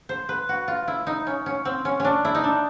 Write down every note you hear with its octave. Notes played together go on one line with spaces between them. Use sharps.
C5
B4
F#4
F4
E4
D#4
C#4
C#4
C4
C#4
C#4 D4
E4
D#4
D4